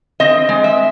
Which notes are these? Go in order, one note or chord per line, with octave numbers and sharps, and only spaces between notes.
C4 D#5
G#3
E5